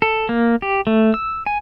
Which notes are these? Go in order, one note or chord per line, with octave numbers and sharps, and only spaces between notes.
A4
A#3
G4
A3
E6
G#5